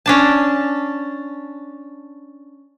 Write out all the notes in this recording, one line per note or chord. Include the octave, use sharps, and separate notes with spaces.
C#4 D4 A5